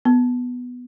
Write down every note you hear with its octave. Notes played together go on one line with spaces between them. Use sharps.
B3